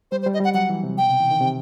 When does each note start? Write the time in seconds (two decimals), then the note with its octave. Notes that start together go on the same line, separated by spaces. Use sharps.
0.11 G3 C5
0.22 C5
0.26 G3
0.34 D#5
0.40 G3 F#5
0.54 F#3 F#5
0.70 E3
0.83 C3
0.98 B2 G5
1.09 C3
1.20 E3
1.31 D#3
1.41 C3